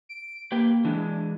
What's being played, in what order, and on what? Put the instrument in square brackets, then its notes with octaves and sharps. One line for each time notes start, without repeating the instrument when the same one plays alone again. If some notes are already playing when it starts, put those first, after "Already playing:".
[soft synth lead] D7
[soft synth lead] A#3 [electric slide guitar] G4 B4 G5
[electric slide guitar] E3 G#3 [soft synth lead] D4